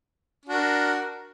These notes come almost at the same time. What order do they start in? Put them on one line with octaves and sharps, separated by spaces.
D4 F#4 A#4